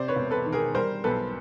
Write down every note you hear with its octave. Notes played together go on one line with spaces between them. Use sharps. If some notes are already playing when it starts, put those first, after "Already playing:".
Already playing: C3 C5 D5
B4 C#5
E1
A4 B4
D#3
G#4 A#4
G3 A#4 C5
B1 A4 B4